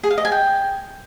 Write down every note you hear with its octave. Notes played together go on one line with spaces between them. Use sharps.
G#4
F5
D#5
G#5
G5